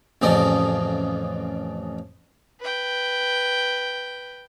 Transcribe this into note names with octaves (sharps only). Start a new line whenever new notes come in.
A1 F2 C#3 F3 D5 D#5
B4 G5